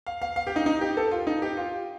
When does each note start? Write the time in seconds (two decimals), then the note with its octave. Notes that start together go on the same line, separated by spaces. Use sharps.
0.07 F5
0.22 F5
0.36 F5
0.47 G4
0.56 D#4
0.66 D#4
0.81 G4
0.97 A4
1.11 F4
1.27 D#4
1.42 G4
1.57 F4